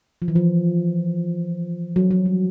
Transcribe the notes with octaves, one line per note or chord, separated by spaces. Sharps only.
F3
E3
F3
F#3
F#3
G3